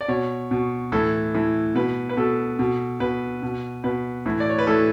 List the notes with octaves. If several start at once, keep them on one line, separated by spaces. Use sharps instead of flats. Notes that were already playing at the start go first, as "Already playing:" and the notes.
D5
B2 C#5
B2
A2 E3 A4
A2 E3
B2 B4
B4
B2 A4
B2
B2 B4
B2
B2 B4
A2 E3
D5
C#5
B4
A2 E3 A4